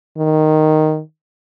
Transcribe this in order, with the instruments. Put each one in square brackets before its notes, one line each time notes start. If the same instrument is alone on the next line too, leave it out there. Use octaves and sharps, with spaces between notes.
[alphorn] D#3